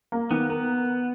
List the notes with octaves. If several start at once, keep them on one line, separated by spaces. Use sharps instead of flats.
A#3
D#3 B3
B3 A#4